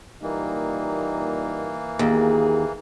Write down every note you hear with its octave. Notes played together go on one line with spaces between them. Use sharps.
A#2 E3 G3 A#3 D#4
D#2 F4 G#4